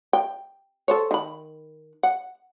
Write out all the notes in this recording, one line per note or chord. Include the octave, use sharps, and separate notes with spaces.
G5
A4 C5 C#5
D#3 B5
F#5